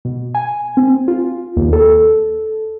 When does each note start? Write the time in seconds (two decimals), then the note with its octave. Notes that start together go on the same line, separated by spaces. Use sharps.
0.05 B2
0.35 G#5
0.77 C4
1.08 F4
1.57 D#2
1.73 A4